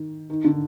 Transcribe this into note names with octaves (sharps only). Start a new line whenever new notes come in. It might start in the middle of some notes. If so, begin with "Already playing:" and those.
Already playing: D#3
D#3
D3